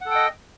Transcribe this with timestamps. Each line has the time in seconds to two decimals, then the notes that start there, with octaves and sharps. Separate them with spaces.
0.01 F#5
0.06 A4
0.11 G5
0.15 D#5